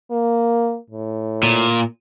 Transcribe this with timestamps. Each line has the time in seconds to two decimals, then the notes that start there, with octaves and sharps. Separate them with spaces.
0.11 A#3
0.90 A2
1.43 A#2